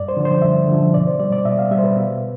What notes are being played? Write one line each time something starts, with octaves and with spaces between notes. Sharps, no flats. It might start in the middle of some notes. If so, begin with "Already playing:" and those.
Already playing: G2 D5
C5
D3 F3
C5
G2 E5
D3 F3
B2 D5
C5
G3 D5
D5
B2 E5
F5
G3 E5
C5
B4
B2